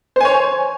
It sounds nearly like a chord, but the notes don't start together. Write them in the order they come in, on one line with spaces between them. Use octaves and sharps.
C5 G#5 C#5